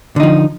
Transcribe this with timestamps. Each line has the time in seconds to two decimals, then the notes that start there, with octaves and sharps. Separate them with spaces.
0.16 D3
0.20 D#4
0.23 F3